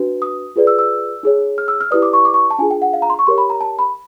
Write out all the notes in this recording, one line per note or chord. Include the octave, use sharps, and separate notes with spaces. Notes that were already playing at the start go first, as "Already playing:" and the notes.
Already playing: D4 F#4 B4
D#6
F4 G#4 B4 D5
E6
E6
D#4 G#4 C#5
F6
E6
F6
E4 G4 B4 D5 D#6
D6
C#6
D6
C#6
A5
D4 F4 G#4 G#5
G5
F#5
F5
A#5
C6
C#6
G4 A#4 C#5 C6
B5
A#5
A5
B5